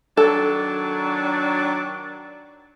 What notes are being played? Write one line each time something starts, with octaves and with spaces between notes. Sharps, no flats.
D#3 F#3 D4 A4